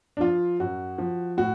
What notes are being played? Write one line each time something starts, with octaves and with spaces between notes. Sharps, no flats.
D4
F3 F4
F#2 F#4
F3
A2 F#4